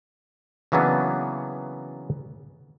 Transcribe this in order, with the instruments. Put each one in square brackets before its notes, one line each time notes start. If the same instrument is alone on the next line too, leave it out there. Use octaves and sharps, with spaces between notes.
[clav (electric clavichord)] C#3 E3 F#3 A#3 B3 D4